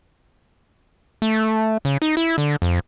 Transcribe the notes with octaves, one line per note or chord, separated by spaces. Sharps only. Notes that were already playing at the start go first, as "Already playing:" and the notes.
A3
C#3
D#4
E4
D3
F2